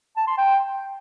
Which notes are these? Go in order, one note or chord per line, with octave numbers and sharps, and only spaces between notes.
A5
C6
G5